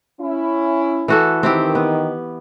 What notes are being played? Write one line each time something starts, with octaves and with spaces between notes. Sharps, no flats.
C#4 E4
E3 F#4 A4
D#3 C4 E4 G4
B3